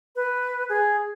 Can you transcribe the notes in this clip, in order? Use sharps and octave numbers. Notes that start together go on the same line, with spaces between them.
B4
G#4